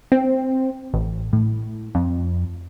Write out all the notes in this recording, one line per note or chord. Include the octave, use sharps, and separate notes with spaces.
C4
A1
A2
F2